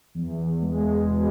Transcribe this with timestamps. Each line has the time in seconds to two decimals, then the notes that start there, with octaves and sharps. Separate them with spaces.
0.15 E2
0.30 E2
0.46 E2
0.62 G#3
0.77 E2
0.93 E2
1.08 B2